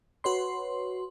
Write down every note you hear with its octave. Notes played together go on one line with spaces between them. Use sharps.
F#4 B4 C#5 C6